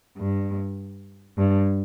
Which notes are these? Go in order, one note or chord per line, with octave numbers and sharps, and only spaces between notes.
G2
G2